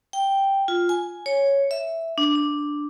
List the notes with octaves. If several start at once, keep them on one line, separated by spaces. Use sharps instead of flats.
G5
F4
G#5
C#5
E5
D4
D4